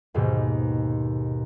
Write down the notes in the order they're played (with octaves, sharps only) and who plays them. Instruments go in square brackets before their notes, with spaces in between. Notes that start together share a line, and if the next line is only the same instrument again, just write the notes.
[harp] D#2 G#2 B2 D#3